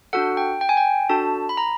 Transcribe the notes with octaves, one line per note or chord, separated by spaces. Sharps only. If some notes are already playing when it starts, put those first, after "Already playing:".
D4 F#4 A4 F#5
G5
G5
G#5
G5
D4 F#4 A4 A5
B5
A#5